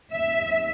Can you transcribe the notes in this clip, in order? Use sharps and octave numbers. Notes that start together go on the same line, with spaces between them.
D#2 E5